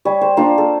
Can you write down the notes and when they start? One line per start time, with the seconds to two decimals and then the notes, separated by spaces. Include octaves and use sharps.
0.05 G3 C#5
0.21 C5
0.37 A#3 D4 F4 C5
0.58 A4